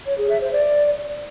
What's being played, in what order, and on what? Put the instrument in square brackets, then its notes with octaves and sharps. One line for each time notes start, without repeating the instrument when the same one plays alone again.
[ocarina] C#5
G#4
E5
C5
D5